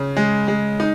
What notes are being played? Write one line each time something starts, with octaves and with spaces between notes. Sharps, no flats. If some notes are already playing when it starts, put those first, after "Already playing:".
Already playing: C#3
G#3
G#3
D#4